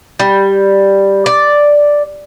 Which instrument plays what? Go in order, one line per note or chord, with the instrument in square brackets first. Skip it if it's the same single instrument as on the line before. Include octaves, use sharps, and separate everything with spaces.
[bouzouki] G3
D5